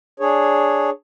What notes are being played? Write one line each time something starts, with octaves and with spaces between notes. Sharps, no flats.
D4 G#4 C#5